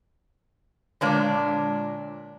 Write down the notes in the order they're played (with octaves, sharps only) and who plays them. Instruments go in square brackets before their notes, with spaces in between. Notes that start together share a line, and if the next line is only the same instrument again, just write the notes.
[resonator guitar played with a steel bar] A#2 D4 C#5 [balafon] D3 G#3 D6